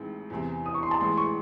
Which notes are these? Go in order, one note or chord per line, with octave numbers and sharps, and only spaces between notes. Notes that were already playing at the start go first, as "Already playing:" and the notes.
Already playing: A1 A2 G#3 C4 D#4
E2 C3 E3 C4
D#6
C#6
C6
A5
A1 A2 E3 G#3 C6
C#6